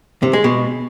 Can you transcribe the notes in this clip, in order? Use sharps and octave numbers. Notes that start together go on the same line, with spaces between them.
C3
G#3
B2